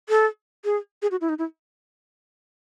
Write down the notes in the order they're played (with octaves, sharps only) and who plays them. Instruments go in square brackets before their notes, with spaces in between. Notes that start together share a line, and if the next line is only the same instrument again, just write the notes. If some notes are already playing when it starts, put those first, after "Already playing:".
[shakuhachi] A4
G#4
G#4
F#4
E4
D#4
E4